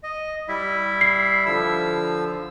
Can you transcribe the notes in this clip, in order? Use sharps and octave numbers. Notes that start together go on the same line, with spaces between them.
D#5
G3 E4 E5
C7
D3 F3 E6